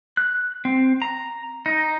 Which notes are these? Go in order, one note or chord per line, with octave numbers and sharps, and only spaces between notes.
F#6
C4
A#5
D#4